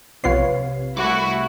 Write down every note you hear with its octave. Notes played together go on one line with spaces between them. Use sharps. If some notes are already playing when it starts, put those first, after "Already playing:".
B1 C3 F4 B4 C#5 F5 C7
C2 A3 E4 F#4 D6